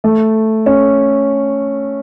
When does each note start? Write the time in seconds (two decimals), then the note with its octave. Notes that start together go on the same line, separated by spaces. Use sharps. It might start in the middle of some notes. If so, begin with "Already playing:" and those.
0.04 A3
0.66 C#4